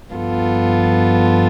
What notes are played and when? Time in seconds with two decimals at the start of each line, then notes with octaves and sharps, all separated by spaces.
0.13 G2 F3 B3 F4 A4